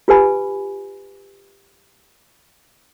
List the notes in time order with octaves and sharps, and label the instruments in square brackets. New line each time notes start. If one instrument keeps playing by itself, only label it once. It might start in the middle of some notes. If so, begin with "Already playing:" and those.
[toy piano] F4 G4 B4 G#5 B5